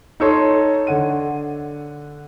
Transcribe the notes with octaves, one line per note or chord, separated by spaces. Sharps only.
D#4 A4 C#5 C6
D3 F#5 D#7